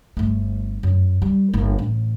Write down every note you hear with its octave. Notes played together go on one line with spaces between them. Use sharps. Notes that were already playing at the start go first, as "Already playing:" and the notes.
G1 A3
F#2
G3
G1 A#3
A1